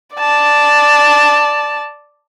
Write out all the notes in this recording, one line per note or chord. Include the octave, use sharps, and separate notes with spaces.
D5 A5